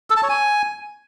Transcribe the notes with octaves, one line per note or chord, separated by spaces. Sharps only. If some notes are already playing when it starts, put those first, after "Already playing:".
A4
A5
C#5
G#5